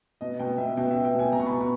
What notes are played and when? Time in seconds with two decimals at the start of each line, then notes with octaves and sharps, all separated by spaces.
0.21 B2 D#5
0.39 B2 G5
0.58 B2 E5
0.77 B2 G5
0.91 B2 E5
1.05 G5
1.15 B2 G#5
1.32 B2 A#5
1.40 C#6
1.47 B2 B5
1.61 C#6